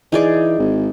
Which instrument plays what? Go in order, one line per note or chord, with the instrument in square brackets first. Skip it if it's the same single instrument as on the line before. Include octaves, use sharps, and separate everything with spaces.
[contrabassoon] E3 [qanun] D#4 G#4 D5
[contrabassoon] G#1